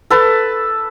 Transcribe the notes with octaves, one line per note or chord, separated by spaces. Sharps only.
A4 B4 A5